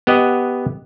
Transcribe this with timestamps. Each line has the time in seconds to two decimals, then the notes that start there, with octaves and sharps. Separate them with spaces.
0.07 B3 G4 D#5 F#5